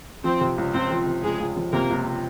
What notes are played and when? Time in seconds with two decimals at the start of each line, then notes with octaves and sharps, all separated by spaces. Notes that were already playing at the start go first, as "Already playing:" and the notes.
0.24 F3 C4 C5
0.41 C3
0.58 C#2
0.73 C#2 C4 C5
0.91 F3
1.06 C3
1.23 C#2 G#3 G#4
1.40 C#2
1.56 F3
1.73 C3 A#3 A#4
1.90 C#2